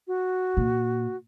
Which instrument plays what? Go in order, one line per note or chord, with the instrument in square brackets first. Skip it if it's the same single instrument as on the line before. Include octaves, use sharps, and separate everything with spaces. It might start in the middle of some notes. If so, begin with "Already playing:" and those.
[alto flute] F#4
[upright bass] A#2